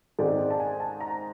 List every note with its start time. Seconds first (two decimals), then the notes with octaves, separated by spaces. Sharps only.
0.19 G#2 D#3 G#3 C4 D5
0.39 D5
0.50 A5
0.60 G#5
0.80 A5
1.00 A#5